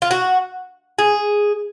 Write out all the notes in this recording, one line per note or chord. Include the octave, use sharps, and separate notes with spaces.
F4
F#4
G#4